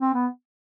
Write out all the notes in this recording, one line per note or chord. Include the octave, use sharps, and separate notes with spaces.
C4
B3